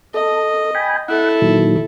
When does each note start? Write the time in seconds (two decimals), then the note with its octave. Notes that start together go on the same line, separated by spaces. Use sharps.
0.14 A4 D#5
0.75 G5 G#5 B5
1.08 E4 A4 F#5
1.42 A#2 D#3 F#3